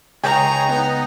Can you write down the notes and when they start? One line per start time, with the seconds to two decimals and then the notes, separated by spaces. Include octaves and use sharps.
0.23 C#2 D#4 G#4 C#5 G5 A#5
0.69 B3 D#4